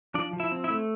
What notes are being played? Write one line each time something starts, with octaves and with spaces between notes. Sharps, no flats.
F3 D4 D5
F3
E4 E5
C4
E4 E5
A3